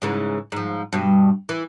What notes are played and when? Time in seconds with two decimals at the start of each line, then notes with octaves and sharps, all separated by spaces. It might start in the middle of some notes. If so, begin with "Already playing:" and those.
0.02 G#2 C#3 E3
0.52 G#2 F3
0.93 G2 B2
1.49 E3